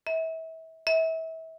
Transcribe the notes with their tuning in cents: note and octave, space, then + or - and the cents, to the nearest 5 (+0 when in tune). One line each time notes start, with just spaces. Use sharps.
E5 -30
E5 -30